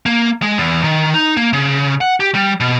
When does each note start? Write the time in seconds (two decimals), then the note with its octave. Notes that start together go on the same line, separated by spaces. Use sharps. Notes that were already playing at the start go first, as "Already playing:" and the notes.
0.06 A#3
0.42 G#3
0.58 E2
0.84 D#3
1.14 D#4
1.37 A#3
1.53 C#3
2.01 F#5
2.20 G4
2.35 G3
2.60 B2